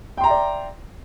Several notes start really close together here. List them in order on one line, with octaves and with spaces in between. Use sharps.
G5 C6 A#5 E5 D5